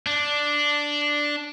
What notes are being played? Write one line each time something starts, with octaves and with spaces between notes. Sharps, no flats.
D4